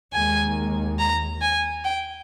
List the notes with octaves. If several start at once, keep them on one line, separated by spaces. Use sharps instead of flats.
D#2 D#3 G#3 G#5
A#5
G#5
G5